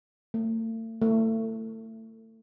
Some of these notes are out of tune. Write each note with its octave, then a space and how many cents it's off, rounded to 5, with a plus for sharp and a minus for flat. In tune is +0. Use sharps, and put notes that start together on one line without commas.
A3 +40
A3 +30